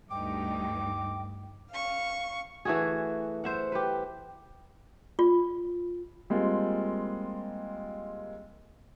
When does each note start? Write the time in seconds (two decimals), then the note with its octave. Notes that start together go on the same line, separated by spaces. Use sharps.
0.11 D2 G2 D#4 G5 D6
1.71 F5 C#6
2.65 E3 A3 F#4 G#4
3.44 C5 E5 F#5
3.72 G4 B4
5.19 F4
6.30 G3 G#3 A#3 C4 F4